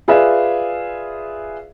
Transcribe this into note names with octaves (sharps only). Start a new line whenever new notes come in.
F4 G#4 B4 D5 E5